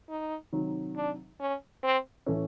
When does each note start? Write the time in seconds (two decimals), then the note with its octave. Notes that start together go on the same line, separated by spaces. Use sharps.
0.09 D#4
0.52 C3 D#3 F#3
0.96 D4
1.40 C#4
1.83 C4
2.26 A2 E3 A3 C#4